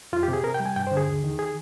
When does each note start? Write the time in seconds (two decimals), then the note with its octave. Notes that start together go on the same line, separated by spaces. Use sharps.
0.13 F2 F4
0.23 G4
0.28 C3
0.33 G#4
0.43 C3 A#4
0.54 G5
0.60 G3
0.66 G#5
0.76 G2 G5
0.87 D3 C5
0.97 G#4
1.07 D#2
1.24 D#3
1.39 G#4